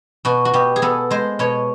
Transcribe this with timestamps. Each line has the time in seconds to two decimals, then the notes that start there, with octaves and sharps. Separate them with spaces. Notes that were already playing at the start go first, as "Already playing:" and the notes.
0.25 B2 F#4
0.45 F#4
0.54 B2 G4
0.76 G#4
0.82 B3 A4
1.11 G#3 C5
1.39 B2 C#5